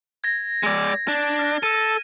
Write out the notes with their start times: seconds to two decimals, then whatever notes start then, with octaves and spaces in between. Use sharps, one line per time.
0.24 G#6 A#6
0.63 G#3 D5
1.08 D4
1.39 F6 A#6
1.63 A4 D#7